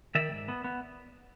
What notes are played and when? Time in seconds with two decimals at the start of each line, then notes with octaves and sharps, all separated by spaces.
0.15 D#3 D5 E5
0.31 G#2
0.48 B3
0.64 B3